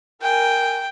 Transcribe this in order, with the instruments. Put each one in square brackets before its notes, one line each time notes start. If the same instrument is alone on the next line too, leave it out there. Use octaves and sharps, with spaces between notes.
[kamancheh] A#4 G#5 [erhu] G5